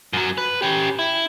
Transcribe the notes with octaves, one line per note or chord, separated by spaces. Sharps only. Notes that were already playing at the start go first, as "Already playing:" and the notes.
F#2 F#3
B4
C#4 G4
E4